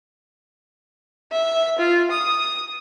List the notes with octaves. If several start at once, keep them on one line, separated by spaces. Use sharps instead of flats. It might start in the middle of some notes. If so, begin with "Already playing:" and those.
E5
F4
D#6